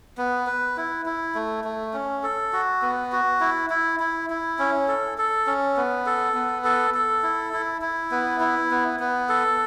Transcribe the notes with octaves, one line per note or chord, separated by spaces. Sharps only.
B3
B4
E4
E4
A3
A3
C#4
A4
F#4
B3
F#4
E4
E4
E4
E4
C#4
A4
A4
C#4
B3
A4
B3
A4
A4
E4
E4
E4
B3
E4
B3
B3
A4